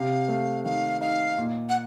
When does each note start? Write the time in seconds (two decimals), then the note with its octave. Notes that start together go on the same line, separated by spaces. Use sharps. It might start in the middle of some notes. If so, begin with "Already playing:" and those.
Already playing: C3 F5
0.28 A3
0.65 D#3 F5
1.01 D#4 F5
1.38 A#2
1.69 F#5